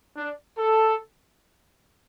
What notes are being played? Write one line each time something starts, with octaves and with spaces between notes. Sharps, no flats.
D4
A4